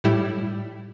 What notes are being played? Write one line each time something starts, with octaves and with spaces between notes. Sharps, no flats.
A2 G3 E4